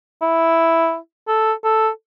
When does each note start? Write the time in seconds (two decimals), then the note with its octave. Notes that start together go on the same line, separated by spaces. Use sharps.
0.22 E4
1.28 A4
1.64 A4